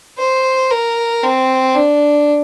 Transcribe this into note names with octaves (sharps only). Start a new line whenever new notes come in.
C5
A#4
C4
D4